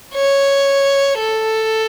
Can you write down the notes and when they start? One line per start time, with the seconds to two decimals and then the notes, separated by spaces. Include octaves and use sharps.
0.14 C#5
1.18 A4